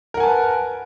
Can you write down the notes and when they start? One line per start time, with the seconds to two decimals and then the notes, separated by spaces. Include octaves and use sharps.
0.14 A#4
0.17 F#5
0.20 G#5
0.23 A5
0.26 B4